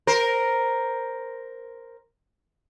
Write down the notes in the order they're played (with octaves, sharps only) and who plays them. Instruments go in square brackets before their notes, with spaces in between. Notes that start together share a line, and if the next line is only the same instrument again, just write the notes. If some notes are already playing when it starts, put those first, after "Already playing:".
[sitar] A#4 C5